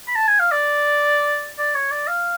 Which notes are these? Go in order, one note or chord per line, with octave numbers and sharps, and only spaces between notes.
B5
A5
G#5
F5
D5
D5
C#5
D5
F5